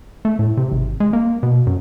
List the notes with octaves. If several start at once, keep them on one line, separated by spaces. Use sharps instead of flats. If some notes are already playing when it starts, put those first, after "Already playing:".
A3
A2
C3
G#1
G#3
A#3
B2
F#2